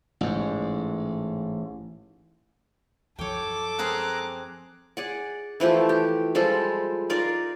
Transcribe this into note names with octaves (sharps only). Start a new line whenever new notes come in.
A1 G#2
F#2 F3 A4 C#5 G5 D6
C4 G#4 A#4 A#5 F#6
G#4 D5 F#5
E3 F3 A3 G4
G4
F3 G3 G#3 A4
D#4 F4 A#4 D5